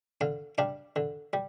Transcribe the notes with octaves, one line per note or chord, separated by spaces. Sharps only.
D3 F5
G3 D4 F5
D3
G3